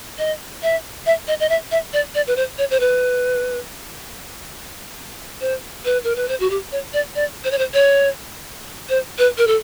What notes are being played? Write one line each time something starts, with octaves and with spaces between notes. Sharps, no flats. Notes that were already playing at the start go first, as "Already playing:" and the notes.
D#5
E5
E5
D#5
D#5
E5
E5
D5
D5
B4
C5
C#5
C5
B4
C5
B4
A#4
B4
C5
F#4
G4
C#5
D5
D5
C5
C#5
C5
C#5
C5
B4
A#4
A4